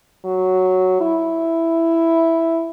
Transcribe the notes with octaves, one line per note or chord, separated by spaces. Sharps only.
F#3
E4